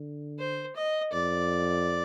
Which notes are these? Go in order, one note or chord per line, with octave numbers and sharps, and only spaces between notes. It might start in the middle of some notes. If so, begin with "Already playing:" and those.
Already playing: D3
C5
D#5
F2 D5